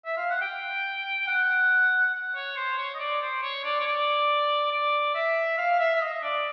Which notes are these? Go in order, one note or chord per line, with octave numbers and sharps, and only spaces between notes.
E5
F5
F#5
G5
F#5
F#5
C#5
C5
C#5
D#5
D5
C5
C#5
D5
C#5
D5
D5
E5
F5
E5
E5
D#5
D5